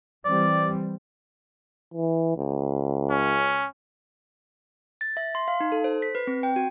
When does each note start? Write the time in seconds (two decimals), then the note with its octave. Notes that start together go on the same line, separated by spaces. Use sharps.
0.25 E3 G3 C4 D5
1.94 E3
2.38 C#2
3.10 C#4
5.01 A6
5.17 E5
5.35 C6
5.48 F5
5.60 D#4
5.72 A4
5.84 C5
6.02 B6
6.15 B4
6.27 C4
6.43 G5
6.56 F#4